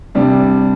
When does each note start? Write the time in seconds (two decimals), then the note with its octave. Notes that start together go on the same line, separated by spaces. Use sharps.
0.15 C3 G3 D4